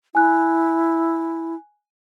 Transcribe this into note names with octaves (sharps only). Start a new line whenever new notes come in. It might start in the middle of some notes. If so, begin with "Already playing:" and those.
E4 G#5 F#6